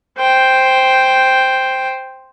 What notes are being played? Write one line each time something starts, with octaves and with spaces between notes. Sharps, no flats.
C5 G5